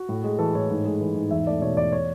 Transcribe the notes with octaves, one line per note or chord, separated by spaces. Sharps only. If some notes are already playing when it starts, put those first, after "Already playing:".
Already playing: F#4
A2
G#3
E3 A4
A2 C#5
G#2
G#3
E3
G#2
E2 E5
A3 D5
B2 C#5
E2 D5
C#5